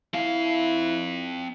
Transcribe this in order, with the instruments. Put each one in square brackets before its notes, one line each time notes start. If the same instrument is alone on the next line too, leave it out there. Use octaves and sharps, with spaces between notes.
[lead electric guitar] C4 F5 [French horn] E4